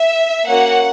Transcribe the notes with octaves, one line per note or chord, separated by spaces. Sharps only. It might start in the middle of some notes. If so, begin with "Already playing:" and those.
Already playing: E5
A#3 C#4 F#4 F#5